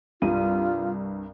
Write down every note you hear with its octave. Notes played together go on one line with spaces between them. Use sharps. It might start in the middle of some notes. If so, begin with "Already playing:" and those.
C2 G2 F4 D#7